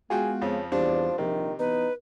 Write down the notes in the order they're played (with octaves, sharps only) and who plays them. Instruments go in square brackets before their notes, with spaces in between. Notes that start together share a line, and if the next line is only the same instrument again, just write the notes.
[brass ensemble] G#3 B3 [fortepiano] F4 F#4 G5 [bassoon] G#4
[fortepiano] F2 F3 [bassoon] C#3
[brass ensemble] E2 D5 [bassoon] F3 [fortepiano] G3 C4 D4
[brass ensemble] A#1 [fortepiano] C3 [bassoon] D#3
[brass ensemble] E3 B3 [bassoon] D#4 [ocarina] B4